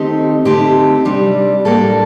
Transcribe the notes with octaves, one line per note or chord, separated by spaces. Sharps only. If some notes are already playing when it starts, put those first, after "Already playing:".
Already playing: D#3 A3 C4 D#4 G4
D3 A3 C4 D#4 G4
C3 G3 D4
A2 G3 A#3 D4 A4